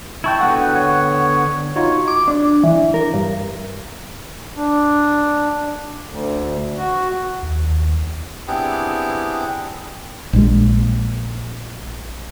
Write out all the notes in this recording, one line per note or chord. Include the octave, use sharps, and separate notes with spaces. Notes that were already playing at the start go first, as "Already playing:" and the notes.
E4 G5 A5 C#6 G6 G#6
D3 B3 F#4 F#5
C#5
D#4 F4 F#4 C#5
D6
D4
E3
A#4
G2
D4
D2
F#4
D#2
B3 C4 D4 E4 G4 G#4
A#1 G#3